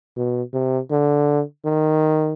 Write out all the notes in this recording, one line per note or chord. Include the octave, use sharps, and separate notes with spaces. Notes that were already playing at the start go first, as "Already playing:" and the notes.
B2
C3
D3
D#3